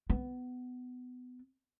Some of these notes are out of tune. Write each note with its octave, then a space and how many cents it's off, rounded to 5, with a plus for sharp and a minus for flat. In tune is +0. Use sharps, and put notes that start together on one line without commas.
B3 +20